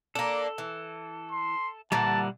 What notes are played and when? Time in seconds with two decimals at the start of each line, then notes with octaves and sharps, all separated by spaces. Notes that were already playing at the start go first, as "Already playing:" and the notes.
0.15 A#3 D4 A4
0.58 E3
1.31 C6
1.92 A#2 D3 E3 G3 F#5 A5